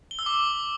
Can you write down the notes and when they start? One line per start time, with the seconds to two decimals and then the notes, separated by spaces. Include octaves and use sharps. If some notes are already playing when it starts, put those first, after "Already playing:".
0.11 G7
0.19 E6
0.26 D6